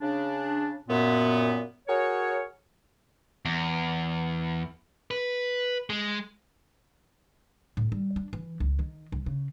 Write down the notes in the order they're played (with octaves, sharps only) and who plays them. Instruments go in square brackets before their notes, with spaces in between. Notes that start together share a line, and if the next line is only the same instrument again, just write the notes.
[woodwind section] C#3 D4
F#2 A#2 B3
F#4 G#4 A#4 C#5
[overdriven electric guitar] E2
B4
G#3
[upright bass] A2
G3
D4
E3
C#2
D#3
C2
C#3